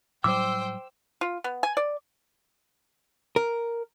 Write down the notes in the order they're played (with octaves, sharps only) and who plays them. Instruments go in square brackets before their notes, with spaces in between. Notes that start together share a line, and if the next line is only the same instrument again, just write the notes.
[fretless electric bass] A2 F#3 G3 [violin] C5 G5 [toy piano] D6 [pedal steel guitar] E6
[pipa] F4
B3
G#5
D5
[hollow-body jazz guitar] A#4